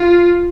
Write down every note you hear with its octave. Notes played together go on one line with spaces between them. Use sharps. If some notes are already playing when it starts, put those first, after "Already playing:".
Already playing: F4